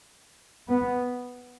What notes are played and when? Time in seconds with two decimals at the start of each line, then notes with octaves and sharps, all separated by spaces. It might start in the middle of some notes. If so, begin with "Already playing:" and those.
0.69 B3